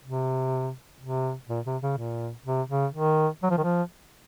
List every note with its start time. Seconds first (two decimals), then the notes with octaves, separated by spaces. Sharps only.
0.04 C3
1.00 C3
1.49 A#2
1.66 C3
1.82 C#3
1.97 A#2
2.45 C3
2.69 C#3
2.94 D#3
3.43 F#3
3.50 F3
3.58 D#3
3.64 F3